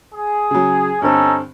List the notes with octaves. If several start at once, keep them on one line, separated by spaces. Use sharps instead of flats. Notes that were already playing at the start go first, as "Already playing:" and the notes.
G#4
C#3 F#3
G2 D3 C4 C#4 D#4 A4